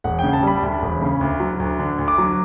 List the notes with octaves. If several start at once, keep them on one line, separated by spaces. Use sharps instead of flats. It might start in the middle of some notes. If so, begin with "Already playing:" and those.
E1 F#5
C#3 G5
A5
G3 B5
D2
E1
C#3
D2
F#3
D2
D3
D2
D6
F#3